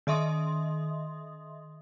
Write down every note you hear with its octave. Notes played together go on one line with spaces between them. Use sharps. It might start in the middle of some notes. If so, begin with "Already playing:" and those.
D#3 D#5 E5 C6 D#6